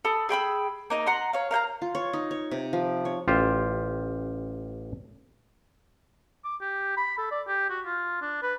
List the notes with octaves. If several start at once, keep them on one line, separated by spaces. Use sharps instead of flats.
A4 B5 D#6
G#4 G5 B5 E6
A#3 D#4 D#5
F#5 A#5 C6
C#5 F5
A#4 F5 G5 A#5
F4
C#5
D#4
C#5
C3
F3
C#5
A1 F4 G4 C5
D6
G4
B5
A4
D5
G4
F#4
F4
D4
B4